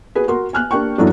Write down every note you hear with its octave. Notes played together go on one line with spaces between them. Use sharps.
F#4 G#4 B4
F#4 A#4 C6
G#5 F6 F#6
A#3 D4 G4 G5 C#6
F#2 A2 E3 F#3 A3 D4